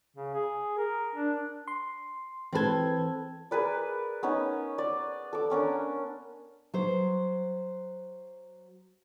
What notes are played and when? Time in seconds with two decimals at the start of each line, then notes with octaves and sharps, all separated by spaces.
0.16 C#3
0.34 G#4
0.78 A#4
1.15 D4
1.68 C6
2.53 E3 C4 A4 B4 G#6
3.51 G#4 A#4 B4 D5
4.23 B3 C#4 D#4 B4
4.78 D5
5.33 A4 D6
5.50 B3 C#4 D4 A#4
6.74 F#3 C5